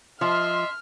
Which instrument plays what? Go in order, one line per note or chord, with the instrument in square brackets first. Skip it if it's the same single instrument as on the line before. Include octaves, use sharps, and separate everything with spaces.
[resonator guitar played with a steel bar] F3 [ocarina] D#5 [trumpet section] E5 C6 [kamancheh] F6